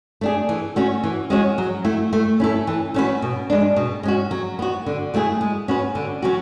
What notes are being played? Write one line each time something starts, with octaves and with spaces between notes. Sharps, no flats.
A3 D4 G#4
E3
A3 C#4 F#4 C#5
E3
G#3 C#4 F#4 C#5
F#3
A3 E4
A3
C#4 E4 A4
E3
A3 C#4 F#4 B4
B2
G#3 D4
B2
G#3 C#4 F#4
F#3
B3 F#4
D3
F#3 A3 E4 G#4
G#3
C#4 F#4 B4
D3
F#3 C#4 F#4